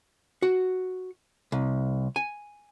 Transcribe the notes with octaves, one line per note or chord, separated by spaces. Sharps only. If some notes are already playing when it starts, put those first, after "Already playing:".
F#4
C2
G#5